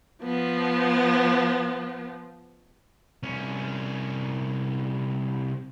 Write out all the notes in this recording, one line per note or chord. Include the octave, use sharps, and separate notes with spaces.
F3 B3
C2 C#4